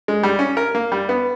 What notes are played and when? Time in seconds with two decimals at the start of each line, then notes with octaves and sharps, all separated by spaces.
0.08 G#3
0.23 G3
0.39 C#4
0.57 A#4
0.75 A#3
0.92 G3
1.09 B3